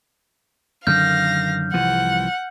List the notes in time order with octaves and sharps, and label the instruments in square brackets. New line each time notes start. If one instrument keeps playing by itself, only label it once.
[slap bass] F#2 D3 D#3 [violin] F5 A#6 [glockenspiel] F6 G6
[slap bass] C2 E3 F3 [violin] F#5